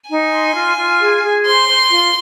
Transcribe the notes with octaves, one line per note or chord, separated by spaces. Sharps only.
D#4 G#5
C6
F4
F4
G#4
G#4
C5 C6
C5
F4